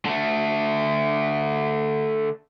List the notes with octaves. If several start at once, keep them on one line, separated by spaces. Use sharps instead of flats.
D3 A3